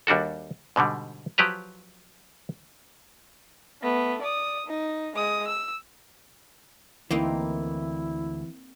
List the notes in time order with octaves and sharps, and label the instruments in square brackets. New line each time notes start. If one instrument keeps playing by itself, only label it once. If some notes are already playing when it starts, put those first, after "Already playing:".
[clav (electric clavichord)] D#2 G3 D4 F#4 A4
G#2 B2 D3 G3
F3 F#3 G4 B4 A#5
[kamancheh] A3 B3
D5 D#6
D#4
G#3 D#6
E6
[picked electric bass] D2 [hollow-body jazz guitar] E3 [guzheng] A#3 C4 D#4 [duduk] E4